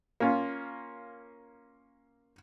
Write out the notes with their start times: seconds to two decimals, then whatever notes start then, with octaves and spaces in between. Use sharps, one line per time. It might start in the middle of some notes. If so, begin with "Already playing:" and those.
0.20 A#3 C#4 F4